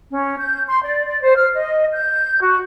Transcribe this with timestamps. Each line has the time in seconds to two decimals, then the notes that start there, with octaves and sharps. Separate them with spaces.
0.10 C#4
0.40 G6
0.67 C6
0.84 D5
1.06 D5
1.23 C5
1.36 F6
1.54 D#5
1.94 G6
2.41 F#4